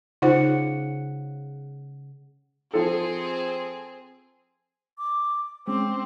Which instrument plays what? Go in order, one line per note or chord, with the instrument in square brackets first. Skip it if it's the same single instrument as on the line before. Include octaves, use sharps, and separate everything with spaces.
[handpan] C#3 F#5 [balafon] D#4 F4 C5
[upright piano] F3 A4 [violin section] C4 G#4
[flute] D6
[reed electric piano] G#3 C#4 [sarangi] C4 [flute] D6